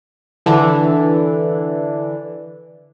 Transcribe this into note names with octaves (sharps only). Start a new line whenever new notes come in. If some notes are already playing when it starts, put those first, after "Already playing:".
D3 E3 D4